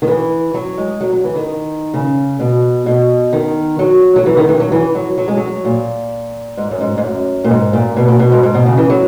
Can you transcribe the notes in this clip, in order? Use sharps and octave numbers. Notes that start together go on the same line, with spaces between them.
D#3
E3
F#3
G#3
F#3
F#3
E3
D#3
C#3
B2
B2
D#3
F#3
F#3
E3
D#3
E3
F#3
E3
F#3
F#3
G#3
F#3
A#2
G#2
F#2
G#2
G#2
F#2
A#2
G#2
A#2
B2
A#2
B2
G#2
G#2
B2
C#3
E3
F#3